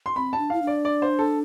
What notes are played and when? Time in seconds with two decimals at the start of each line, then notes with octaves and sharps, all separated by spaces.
0.06 C6
0.16 C4 B5
0.33 A5
0.38 D4
0.50 E4 F5
0.62 D4
0.67 D5
0.85 D5
1.02 C5
1.19 A4